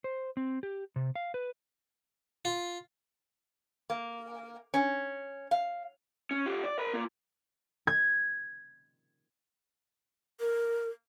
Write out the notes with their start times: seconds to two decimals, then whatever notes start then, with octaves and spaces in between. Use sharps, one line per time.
0.04 C5
0.37 C4
0.63 G4
0.96 C3
1.15 F5
1.34 B4
2.45 F4
3.90 A#3
4.74 C#4
5.51 F5
6.31 C#4
6.46 F4 G4
6.64 D5
6.78 A#4 B5
6.94 A#3 F4
7.87 G#6
10.40 A#4